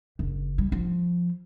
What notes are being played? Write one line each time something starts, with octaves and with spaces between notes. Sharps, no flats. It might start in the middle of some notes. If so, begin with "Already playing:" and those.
F#1
G3
F3